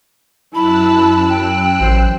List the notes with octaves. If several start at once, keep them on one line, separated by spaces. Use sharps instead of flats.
F#2 E4 A5 B5 E6 F#6
G5
A1 C5